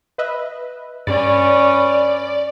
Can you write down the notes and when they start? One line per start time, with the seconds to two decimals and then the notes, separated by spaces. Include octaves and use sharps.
0.18 B4 D#5 E5
1.07 G2 C#4 B4 D5